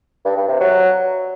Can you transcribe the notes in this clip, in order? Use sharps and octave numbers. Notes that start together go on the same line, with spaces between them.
G2
G2
C3
F#3